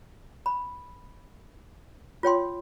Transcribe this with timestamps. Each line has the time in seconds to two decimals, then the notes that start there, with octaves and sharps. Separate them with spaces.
0.46 B5
2.23 F4 C#5 G5 C6